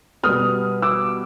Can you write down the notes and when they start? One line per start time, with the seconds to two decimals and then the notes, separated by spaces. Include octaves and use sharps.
0.23 B2 G3 B3 D#6 F6
0.82 D6 E6